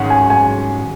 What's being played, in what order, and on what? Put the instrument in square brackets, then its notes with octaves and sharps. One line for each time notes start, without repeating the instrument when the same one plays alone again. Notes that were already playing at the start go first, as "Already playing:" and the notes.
Already playing: [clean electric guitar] G#2 D#3 G#3 C#4 [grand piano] F#5
[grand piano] G#5
G#5